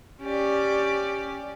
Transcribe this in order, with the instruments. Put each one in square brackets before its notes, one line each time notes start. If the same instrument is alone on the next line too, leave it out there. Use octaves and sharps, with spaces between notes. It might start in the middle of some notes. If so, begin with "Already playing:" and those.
[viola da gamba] C#4 G4 D5